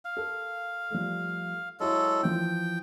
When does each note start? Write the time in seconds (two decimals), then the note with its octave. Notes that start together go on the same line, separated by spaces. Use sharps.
0.05 F5
0.17 A4 A#4
0.91 F3 G3 A3
1.80 F#3 G#3 E4 F#4 A4
2.23 E3 F3 G5